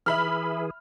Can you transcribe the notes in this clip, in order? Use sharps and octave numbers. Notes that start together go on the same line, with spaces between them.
E3 G#4 E5 B5 F6